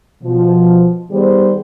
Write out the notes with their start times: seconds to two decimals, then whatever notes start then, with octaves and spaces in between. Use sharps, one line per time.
0.23 B2 F3
1.11 D#3 G3 B3 G#4 C5